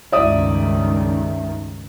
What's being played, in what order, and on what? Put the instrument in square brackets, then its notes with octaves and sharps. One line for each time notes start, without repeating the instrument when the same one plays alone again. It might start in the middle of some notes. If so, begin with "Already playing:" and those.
[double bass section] C#2 G2 D#3 [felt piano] D5 E5 D#6